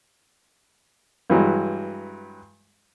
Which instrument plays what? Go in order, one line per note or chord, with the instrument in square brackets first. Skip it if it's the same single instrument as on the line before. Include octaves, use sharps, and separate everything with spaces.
[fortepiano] G2 E3 F#3 G#3